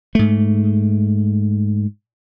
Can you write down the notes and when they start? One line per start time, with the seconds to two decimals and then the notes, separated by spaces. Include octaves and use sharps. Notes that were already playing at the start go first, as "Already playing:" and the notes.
0.15 G#2 A3